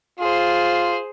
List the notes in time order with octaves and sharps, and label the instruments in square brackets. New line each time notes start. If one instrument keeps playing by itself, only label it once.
[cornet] F4 [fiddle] G#4 C5